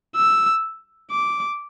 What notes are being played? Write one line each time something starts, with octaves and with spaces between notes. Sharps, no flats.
E6
D6